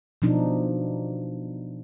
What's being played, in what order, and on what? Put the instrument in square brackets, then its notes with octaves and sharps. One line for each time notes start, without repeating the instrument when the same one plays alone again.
[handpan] B2 F3 D4 D#4